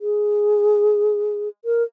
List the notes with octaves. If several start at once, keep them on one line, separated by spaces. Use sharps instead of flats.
G#4
A#4